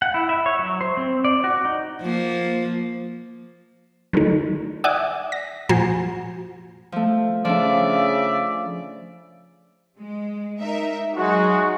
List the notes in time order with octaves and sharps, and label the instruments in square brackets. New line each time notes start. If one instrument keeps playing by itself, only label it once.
[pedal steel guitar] F#5
E4
E5
C#5
F#3
C5
C4
D5
F#4
D#4
[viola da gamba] F3 A#3
[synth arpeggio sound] D3 D#3 F#3 A3 D#4
D5 E5 F#5 G#5 D6 D#6
A#6
A#2 F3 F#4 G#5 A#5 C7
[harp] F3 A3
[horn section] C#3 D5 E5 [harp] F3 D4
[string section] G#3
D#4 A#4 E5
[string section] F#3 D#4 [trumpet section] G#3 F#4